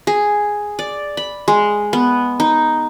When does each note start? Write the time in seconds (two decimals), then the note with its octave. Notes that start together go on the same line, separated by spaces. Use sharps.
0.07 G#4
0.79 D5
1.17 B5
1.48 G#3
1.93 B3
2.40 D#4